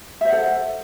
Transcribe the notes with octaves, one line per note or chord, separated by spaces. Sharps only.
A4 C5 E5 F#5